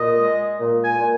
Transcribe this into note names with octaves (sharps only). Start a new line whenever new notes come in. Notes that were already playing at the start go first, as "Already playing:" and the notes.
Already playing: A#2 D#5
G#3
A#2
G#5
A#2